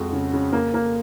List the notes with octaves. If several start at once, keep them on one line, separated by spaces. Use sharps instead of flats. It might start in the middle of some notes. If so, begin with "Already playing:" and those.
Already playing: F2 G#3 F#4
C#3
C#3
A#3
A#3